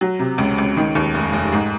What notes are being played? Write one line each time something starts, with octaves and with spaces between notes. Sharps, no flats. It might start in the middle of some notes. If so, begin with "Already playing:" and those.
F#3
C3
C#2
C#2
D#3
D#2
F1
F1
G#2